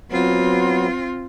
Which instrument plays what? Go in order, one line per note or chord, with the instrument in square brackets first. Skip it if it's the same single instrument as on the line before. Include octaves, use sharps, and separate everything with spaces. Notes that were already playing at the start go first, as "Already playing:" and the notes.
[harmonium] F#3 B3 [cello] C4 F4